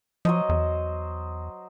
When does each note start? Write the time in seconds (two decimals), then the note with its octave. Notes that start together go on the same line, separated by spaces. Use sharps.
0.25 F3 F#3 C5 D#5
0.49 E2